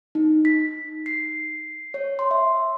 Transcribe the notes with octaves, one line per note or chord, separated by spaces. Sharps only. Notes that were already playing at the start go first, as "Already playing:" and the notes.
D#4
B6
C7
C#5
C6
E5